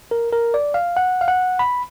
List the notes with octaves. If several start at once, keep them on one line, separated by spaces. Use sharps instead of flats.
A#4
A#4
D5
F5
F#5
F5
F#5
B5